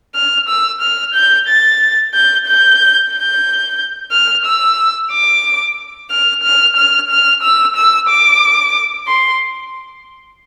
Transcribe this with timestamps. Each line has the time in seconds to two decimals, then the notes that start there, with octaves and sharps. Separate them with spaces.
0.15 F6
0.48 E6
0.81 F6
1.15 G6
1.48 A6
2.14 G6
2.47 G6
3.12 G6
4.12 F6
4.45 E6
5.12 D6
6.11 F6
6.43 F6
6.76 F6
7.10 F6
7.43 E6
7.76 E6
8.09 D6
9.08 C6